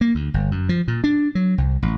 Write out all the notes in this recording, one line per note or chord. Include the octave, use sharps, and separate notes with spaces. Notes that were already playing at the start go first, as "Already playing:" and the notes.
A#3
D2
G1
F#2
F3
A#2
D4
F#3
C2
A1